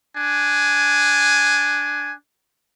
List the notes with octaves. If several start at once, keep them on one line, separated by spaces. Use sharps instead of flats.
D4 G#5